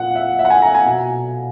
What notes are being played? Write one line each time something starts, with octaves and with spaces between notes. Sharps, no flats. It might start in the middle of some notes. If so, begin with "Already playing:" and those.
Already playing: A#2 F#5
E5
E5
F#5
G#5
A#5
G#5
B2